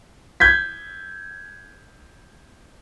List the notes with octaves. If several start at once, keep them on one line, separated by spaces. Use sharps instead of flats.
G6 G#6 B6